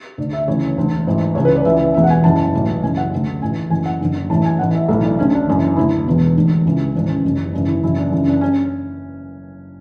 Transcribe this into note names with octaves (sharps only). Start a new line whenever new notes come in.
D2 D3 D5
E5
D2 C#3 E3 C#5
E1 D2 D3
A1 G#2 E3
C#2 C#3 E3 C#5
B4
D5
C#2 C#3 E3 E5
E5
E1 E2 B2 E5
F#5
G#5
F#1 F#2 E3 A5
B1 A2 E3
F#1 F#2 C#3 E3 G#5
F#5
D2 D3
A1 A2 E3 G#5
F#1 F#2 E3 G#5
F#5
F#1 F#2 D3
A1 A2 E3 A5
G#5
A1 A2 E3 F#5
E5
B1 A2 E3 A4
D4
D2 D3 C#4
D4
F#1 F#2 E3
D2 D3 E4
E1 E2 B2
E1 D2 D3
C#2 C#3 E3
G#1 G#2 E3 D4
C#4
F#1 F#2 E3 C#4
G#1 F#2 C#3 E3 D4
E4
F#1 F#2 C#3 E3 E4
D4
F#1 F#2 C#3 E3 D4
D4
C#4